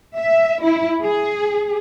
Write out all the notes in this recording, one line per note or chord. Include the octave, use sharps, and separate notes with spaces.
E5
E4
G#4